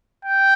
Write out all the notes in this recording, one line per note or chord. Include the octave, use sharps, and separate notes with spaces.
G5